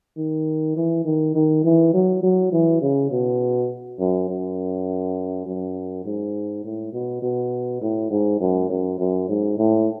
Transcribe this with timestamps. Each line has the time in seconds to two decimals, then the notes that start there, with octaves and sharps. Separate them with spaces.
0.17 D#3
0.76 E3
1.05 D#3
1.35 D#3
1.64 E3
1.94 F#3
2.23 F#3
2.52 E3
2.82 C#3
3.11 B2
4.00 F#2
4.29 F#2
5.46 F#2
6.05 G#2
6.64 A2
6.93 B2
7.22 B2
7.81 A2
8.11 G#2
8.40 F#2
8.70 F#2
8.99 F#2
9.29 G#2
9.58 A2